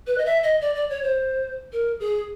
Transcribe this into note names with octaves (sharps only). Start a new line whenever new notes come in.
B4
D#5
E5
D#5
D5
D5
C#5
C5
A#4
G#4